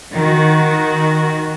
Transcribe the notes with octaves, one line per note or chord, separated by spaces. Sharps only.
D#3 F#4